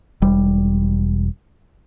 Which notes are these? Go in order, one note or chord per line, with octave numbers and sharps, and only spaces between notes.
E1 G3